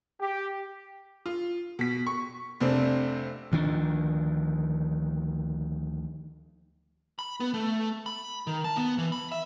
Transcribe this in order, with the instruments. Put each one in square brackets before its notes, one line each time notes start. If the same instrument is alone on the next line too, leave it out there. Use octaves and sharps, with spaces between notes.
[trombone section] G4
[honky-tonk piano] F4
B2 B6
C#6
F1 C3 C4 D4
[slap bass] D2 D#3 F3 D4
[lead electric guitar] B5
B3
A3
B5
D#3
A5
B3
E3
B5
E5